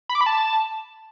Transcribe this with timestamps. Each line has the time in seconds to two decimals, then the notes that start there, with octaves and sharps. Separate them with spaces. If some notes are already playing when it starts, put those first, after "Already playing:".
0.09 B5
0.15 D6
0.21 B5
0.26 A5